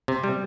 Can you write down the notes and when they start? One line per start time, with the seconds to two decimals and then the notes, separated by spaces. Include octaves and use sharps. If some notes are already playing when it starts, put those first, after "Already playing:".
0.08 C3
0.24 G3